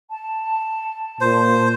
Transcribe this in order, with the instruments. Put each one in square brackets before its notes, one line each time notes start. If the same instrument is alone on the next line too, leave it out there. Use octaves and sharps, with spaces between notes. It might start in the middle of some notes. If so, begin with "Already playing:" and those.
[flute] A5
[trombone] A#2 [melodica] C5